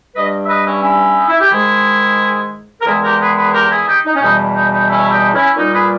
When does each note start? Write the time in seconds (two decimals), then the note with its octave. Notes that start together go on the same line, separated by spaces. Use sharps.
0.15 G2 G3 B4 D#5
0.44 E5
0.49 B4 D#5
0.66 C#4 E4
0.83 C#4 E4
1.16 D#4
1.28 E4
1.39 G4
1.50 G#2 D#3 G#3 E4 G#4
2.81 A#4
2.86 E2 D#3 G#3 E4 G#4
3.03 G4 A#4
3.20 G#4 B4
3.36 G#4 B4
3.53 G4 A#4
3.71 E4 G#4
3.87 D#4 G4
4.05 D#4
4.15 C#4
4.21 E2 B2 G3 D#4
4.55 D#4
4.72 D#4
4.89 C#4 E4
5.03 E4
5.11 D#4 G4
5.34 C#4 E4
5.57 A#2 G3 D#4
5.74 G#4 B4